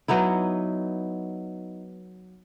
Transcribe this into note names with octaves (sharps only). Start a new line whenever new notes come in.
F#3 B3 D#4 E4